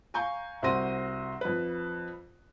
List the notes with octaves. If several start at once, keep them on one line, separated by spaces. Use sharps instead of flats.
F5 G#5 A#5 C#6 G6
C2 C4 F#4 C6 A#6 D#7
F2 B4